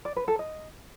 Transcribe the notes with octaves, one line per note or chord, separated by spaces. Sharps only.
D5
B4
A4
D#5